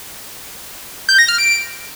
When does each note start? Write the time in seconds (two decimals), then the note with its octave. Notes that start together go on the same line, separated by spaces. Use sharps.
1.09 G6
1.19 A#6
1.28 F6
1.38 D7